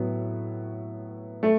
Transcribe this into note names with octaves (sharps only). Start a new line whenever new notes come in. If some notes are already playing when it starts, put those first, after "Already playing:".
Already playing: A2 F#3 B3
A3